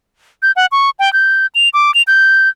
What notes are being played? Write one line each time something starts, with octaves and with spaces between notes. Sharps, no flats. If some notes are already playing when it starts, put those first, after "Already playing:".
G6
F#5
C#6
G5
G6
F7
D6
F7
G6